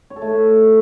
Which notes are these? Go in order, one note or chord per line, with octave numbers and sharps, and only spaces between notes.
C#5
A4
A3